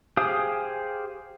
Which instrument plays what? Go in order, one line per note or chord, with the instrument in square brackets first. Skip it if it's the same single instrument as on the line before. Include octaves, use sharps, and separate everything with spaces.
[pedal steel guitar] G4 G#4 C5 F5 D#6